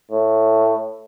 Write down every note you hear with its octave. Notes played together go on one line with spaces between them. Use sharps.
A2